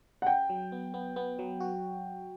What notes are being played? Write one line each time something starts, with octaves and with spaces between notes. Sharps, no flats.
F#5
C#3 G5
F#3
B3
B3
B3
F#3
F#4